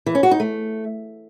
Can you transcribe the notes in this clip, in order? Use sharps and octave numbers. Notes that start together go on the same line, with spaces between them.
E3
C#4
F#4
D#4
A3